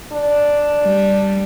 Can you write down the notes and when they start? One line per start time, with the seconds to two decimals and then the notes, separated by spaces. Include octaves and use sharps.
0.12 D4
0.85 G3